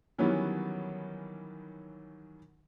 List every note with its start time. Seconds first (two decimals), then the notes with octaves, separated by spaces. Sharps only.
0.18 D#3 E3 F#3 G3 B3 C#4